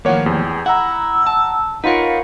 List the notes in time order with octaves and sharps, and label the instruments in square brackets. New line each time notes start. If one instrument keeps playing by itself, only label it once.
[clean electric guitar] D#2 A2 F3 [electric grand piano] A#3 C#5 F#5
[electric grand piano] E2 [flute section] G4 G#4
[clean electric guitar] E4 [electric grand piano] F#5 A#5 [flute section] E6
[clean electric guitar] A5
[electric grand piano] D#4 F4 [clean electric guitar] A#4 B4 [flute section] C#5 F5 F#5